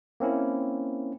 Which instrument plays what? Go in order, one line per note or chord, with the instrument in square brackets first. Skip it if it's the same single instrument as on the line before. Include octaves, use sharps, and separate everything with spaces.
[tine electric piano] A#3 C4 C#4 E4